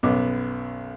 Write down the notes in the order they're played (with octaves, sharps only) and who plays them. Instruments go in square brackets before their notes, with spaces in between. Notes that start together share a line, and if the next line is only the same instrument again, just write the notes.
[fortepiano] B1 F#2 B3 D6